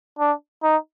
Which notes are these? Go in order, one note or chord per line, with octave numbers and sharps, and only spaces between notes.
D4
D#4